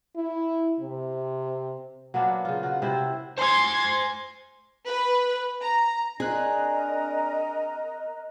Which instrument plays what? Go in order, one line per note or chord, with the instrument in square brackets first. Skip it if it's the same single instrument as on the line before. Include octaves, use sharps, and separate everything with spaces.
[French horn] E4
C3
[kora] F#3 A#3 B3 D4
C#3 F4
F4 F#4
C3 E4 C5
[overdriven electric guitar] C5 G#5 [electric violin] C6 G#6
[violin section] B4
A#5
[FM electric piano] C4 F#6 [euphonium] D4 [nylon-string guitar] G#4 [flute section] A#4 D#5 A#5